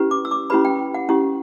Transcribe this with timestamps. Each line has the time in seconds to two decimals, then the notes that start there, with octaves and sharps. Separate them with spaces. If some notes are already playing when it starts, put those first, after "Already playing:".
Already playing: C#4 E4 G4 B4
0.11 D6
0.25 E6
0.31 D6
0.50 C#4 E4 G4 B4 B5
0.65 G5
0.94 F#5
1.09 C#4 E4 G4